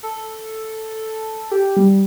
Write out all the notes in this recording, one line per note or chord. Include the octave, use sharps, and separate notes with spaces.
A4
G4
G3